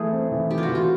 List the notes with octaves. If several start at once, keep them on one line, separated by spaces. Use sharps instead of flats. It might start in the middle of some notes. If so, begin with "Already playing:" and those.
Already playing: E3 A3 G#4
C4
E3
E3 G4
F4
F#4
E3
F4